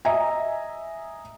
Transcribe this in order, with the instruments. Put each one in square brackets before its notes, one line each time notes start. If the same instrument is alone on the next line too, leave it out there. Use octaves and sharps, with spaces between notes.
[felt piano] D#5 E5 G#5 A#5